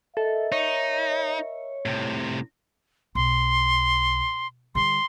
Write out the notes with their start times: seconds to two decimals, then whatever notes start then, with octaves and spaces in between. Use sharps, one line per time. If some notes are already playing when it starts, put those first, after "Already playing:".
0.17 A4 A#4 D#5 E5
0.52 D#4 C#5
1.86 A2 C3
3.15 B1 C6
4.75 D3 G3 C6